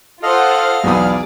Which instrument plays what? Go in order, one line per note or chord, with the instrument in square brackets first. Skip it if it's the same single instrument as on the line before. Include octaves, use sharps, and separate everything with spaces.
[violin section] F4 C5 F#5 [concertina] A4 D#5 [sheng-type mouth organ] F5 F6
[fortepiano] B1 E2 D#6 [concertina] G#4 [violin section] D5